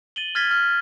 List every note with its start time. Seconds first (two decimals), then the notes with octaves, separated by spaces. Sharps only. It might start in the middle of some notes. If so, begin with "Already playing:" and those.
0.16 A6 D#7 F#7 G7
0.35 F6 G#6 A6 B6 G7
0.51 F6